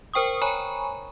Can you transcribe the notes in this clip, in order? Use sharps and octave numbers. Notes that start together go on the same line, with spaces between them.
A#4 C5 G5 C#6 D#6
C#5 G#5 A#5 B5 C#6